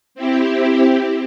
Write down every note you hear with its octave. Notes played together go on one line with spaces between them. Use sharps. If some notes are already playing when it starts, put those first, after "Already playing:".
C4 E4 G4